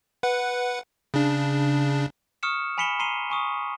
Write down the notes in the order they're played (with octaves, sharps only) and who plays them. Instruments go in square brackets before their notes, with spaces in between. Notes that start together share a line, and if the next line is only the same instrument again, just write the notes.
[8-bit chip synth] B4 F#5
C#3 D4
[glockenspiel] C#6 D#6 F6 C#7 E7
G#5 B5 B6 C#7 E7 G7
A#5 C6 C7 D#7 F7 G7
G#5 C#6 D#6